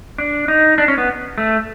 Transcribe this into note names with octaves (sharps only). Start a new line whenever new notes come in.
D4
D#4
D4
C#4
B3
A3